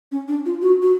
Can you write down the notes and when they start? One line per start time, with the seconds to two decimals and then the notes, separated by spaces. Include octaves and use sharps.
0.12 C#4
0.28 D4
0.46 F4
0.62 F#4
0.82 F#4